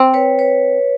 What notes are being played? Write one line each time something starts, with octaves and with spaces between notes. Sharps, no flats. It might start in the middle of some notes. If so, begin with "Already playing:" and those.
Already playing: C4
B4 C#5
B4 C#5